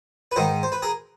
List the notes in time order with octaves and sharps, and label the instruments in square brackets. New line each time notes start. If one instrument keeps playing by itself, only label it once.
[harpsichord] B4
G#2 D#3 A#4 C5
C5
B4
G#4 A#4